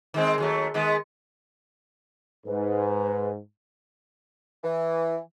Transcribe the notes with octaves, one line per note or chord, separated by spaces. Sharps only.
D#3 G#3 C4
D#2 F#3 A3
D#3 G#3 B3
G#2 B4
E3